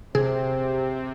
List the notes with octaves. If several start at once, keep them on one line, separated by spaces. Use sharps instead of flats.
C3 C4 G#4